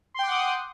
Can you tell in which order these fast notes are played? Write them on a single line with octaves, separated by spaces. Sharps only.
C6 G5 D6 F#5 D#6